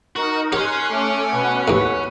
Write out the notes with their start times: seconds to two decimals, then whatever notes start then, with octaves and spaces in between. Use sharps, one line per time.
0.16 D#4 F#4 A#4
0.53 G4 C#5 G#5 C6 F6 F#6
0.88 A3 C#4 D6
1.31 B2 B4 F#5
1.68 D#2 A2